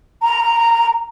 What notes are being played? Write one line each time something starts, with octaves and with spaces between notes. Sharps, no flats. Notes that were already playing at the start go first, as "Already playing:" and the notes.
A#5